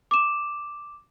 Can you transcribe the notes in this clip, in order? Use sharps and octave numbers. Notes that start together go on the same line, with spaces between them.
D6 E7